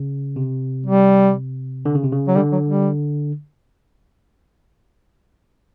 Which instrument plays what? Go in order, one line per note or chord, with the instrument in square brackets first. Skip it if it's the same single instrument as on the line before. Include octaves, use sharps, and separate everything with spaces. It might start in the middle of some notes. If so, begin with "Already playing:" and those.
Already playing: [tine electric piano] C#3
C3
[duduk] G3
[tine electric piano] D3
C#3
C3
C#3
[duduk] F#3
[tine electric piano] D3 [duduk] G3
[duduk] F#3
G3